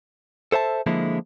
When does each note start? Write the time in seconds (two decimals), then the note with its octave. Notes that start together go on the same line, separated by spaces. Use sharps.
0.52 A4 C5 E5 A5
0.87 D3 F3 G#3 A#3 E4